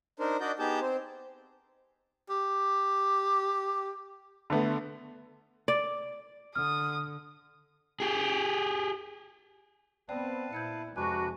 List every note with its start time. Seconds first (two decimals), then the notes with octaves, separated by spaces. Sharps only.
0.19 D4 D#4 A#4 C5
0.40 D4 F#4 D5 D#5 G6
0.59 B3 D#4 G4 G#4 A5 G6
0.81 C4 C5
2.30 G4
4.50 D3 A3 B3
5.68 D5
6.55 D3 D#6 F6
8.00 G4 G#4
10.08 B3 C4 B4 C5 D5 F5 G5 A5
10.53 A#2 E4 G6 G#6 C#7
10.96 F2 C3 G#3 D4 F#4 B4 G#5 C#6